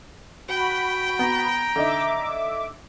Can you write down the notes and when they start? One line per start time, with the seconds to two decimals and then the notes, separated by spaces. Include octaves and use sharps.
0.49 F#4 G5 B5
1.19 B3 A#5
1.76 D3 D#4 E5 D6